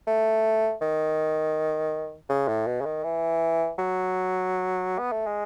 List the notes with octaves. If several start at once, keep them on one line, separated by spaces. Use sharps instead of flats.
A3
D#3
C#3
A2
B2
C#3
D#3
E3
F#3
B3
A3
G#3